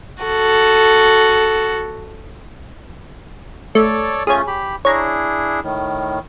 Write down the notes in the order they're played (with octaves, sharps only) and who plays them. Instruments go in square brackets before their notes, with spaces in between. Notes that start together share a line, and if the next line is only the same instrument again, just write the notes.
[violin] F#4 A4
[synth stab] A3 [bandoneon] A4 C#5 D5
[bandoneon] A3 C#4 F4 [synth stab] G#4 C#5
[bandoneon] G4 B5
[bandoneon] D4 E4 G#4 [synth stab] C#5 A#5
[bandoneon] A2 D#3